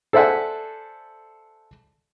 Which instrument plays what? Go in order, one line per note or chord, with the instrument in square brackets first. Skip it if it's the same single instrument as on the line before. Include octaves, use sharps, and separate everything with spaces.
[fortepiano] A4 C5 D5 E5 F#5 G#5